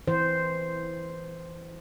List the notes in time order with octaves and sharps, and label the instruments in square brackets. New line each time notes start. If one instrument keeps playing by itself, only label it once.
[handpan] E3 C5